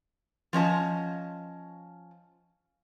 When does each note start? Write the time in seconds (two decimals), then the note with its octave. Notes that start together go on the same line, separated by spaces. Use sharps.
0.53 F3 C#4 D#5 A5